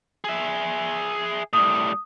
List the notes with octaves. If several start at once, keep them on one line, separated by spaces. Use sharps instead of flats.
G#4 E5
A2 G3 D#6